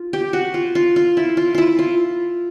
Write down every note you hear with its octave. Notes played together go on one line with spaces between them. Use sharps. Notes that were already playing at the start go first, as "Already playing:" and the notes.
Already playing: F4
G4
F#4
F4
F4
F4
E4
F4
E4 F4
F4